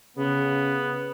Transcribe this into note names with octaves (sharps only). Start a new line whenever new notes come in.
C#3 B3